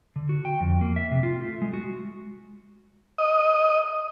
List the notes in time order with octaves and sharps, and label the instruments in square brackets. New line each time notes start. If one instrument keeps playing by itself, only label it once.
[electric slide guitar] D3
F#4
G5
F2
A#3
E5
C3
F4
A3
G#3
F#4
[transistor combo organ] D#5